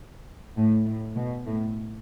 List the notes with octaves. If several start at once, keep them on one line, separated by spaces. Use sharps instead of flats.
A2
A2
B2
A2